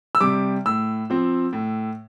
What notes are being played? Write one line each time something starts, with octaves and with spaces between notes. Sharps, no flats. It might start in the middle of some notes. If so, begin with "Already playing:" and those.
E6
C3 G3 D6
A2 E6
F3 C4
A2